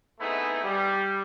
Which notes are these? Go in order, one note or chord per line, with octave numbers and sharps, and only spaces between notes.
A3 B3 C4 D#4 E4 G#4
G3